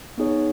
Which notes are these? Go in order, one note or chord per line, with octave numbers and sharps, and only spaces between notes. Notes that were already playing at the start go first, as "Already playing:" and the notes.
B3 D#4 G#4 C#5